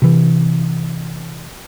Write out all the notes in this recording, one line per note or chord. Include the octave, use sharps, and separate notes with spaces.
C3 E3